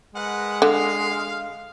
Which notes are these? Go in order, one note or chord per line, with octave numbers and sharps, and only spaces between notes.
G#3 A#4 B4 F#5
D3 F5